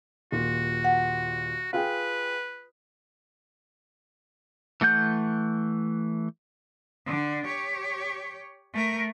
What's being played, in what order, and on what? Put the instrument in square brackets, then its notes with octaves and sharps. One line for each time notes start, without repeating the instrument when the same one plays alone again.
[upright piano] D#1 A#2 [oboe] F#4
[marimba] F#5
[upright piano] F4 G#4 G5 [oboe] B4
[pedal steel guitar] E3 A3 F#5 G6
[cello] D3 D4
G4 C#5
A3 A#4